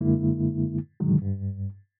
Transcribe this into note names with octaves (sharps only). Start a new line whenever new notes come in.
F#2 D3 G#3 A#3 E4
G2 B2 D3 D#3 F#3 G#3
G2